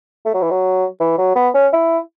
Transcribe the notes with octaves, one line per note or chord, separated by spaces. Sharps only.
A3
F#3
E3
F#3
E3
F#3
B3
C#4
E4